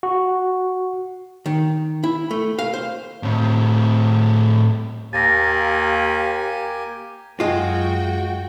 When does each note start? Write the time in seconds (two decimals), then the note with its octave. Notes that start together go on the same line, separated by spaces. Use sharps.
0.03 F#4
1.46 D#3
2.04 E4
2.31 A3
2.59 F5
2.74 C5
3.23 A2 C4
5.13 D#2 A#3 G4 G#5 A6 A#6
7.40 F#2 G#3 F4 F#4 G5